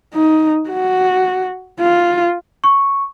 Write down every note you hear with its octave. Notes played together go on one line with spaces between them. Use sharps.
D#4
F#4
F4
C#6